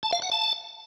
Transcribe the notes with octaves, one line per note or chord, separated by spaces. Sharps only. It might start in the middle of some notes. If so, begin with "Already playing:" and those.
A5
F5
F#5
A5